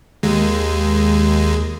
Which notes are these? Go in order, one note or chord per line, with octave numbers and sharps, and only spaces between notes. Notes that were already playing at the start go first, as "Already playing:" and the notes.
D#2 G#3